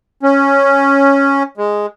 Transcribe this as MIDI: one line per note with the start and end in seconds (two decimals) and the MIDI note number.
0.23 1.43 61
1.57 1.86 56